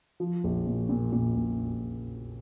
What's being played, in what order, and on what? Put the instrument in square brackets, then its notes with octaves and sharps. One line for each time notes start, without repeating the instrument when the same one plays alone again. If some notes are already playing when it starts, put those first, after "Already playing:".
[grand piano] F3
A#1
A#2
A#2
A#2
A#1